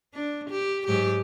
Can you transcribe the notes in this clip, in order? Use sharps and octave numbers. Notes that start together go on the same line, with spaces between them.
D4
G4
G#2 F#3 G4